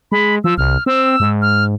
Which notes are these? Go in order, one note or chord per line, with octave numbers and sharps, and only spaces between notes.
G#3 B5
F3 E6
C2 F6
C4 E6
G#2
F6